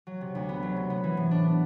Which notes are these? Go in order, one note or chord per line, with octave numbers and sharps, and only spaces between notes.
F#3
C3
D2
B3
F#3
C3
B3
E3
A2
D4
B3